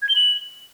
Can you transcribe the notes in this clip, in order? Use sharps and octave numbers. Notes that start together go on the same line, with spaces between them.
G#6
G7
F#7